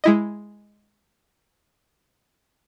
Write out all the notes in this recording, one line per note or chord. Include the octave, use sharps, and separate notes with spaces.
G#3 E4 D#5